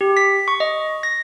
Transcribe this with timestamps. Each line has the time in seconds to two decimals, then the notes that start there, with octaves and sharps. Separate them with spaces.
0.01 G4
0.17 B6
0.48 C#6
0.60 D#5
1.03 A#6